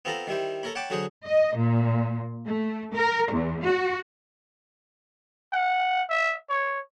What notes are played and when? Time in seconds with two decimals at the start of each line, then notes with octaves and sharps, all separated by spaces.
0.05 B3 C4 F4 A4 A#5 B5
0.27 D#3 G3 E4 C5
0.63 A4 A#4 C#5 B5
0.75 C#5 F#5 G5 A5 B5 D6
0.90 D3 F#3 F#4 G#4 C5 F#5
1.27 D#5
1.57 A#2
2.47 A3
2.95 A#4
3.34 E2
3.65 F#4
5.53 F#5
6.09 E5
6.49 C#5